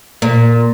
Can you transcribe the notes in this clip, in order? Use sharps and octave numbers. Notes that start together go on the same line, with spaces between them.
A#2